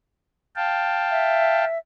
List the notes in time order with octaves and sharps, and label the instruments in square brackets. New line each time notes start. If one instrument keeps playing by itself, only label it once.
[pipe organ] F5 G5 A5
[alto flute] E5